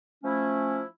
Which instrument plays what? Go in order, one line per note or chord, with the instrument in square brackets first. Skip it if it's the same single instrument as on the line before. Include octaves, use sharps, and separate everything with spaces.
[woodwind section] F3 A3 C#4 E4